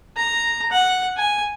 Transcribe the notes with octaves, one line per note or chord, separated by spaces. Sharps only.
A#5
F#5
G#5